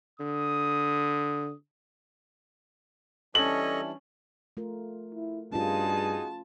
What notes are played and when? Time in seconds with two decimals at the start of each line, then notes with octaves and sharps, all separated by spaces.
0.20 D3 D#6
3.35 E3 G3 C#4 D4 A4 D#5 F#7
4.57 A3 F4 A#4
5.14 E4
5.52 G2 C#4 D#4 F4 F#4 G#4 A5